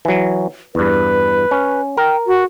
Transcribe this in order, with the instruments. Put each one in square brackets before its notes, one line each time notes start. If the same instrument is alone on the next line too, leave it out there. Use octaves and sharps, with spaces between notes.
[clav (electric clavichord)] E3 F#3
[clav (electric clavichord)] E2 G2 [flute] B4
[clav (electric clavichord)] C#4
[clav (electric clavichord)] A#4 [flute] G5
[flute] F#4